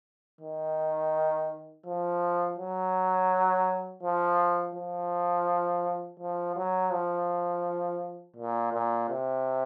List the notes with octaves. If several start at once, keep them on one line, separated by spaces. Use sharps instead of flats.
D#3
F3
F#3
F3
F3
F3
F#3
F3
A#2
A#2
C3